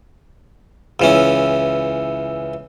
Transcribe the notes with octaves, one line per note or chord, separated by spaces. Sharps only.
C#2 E3 C#4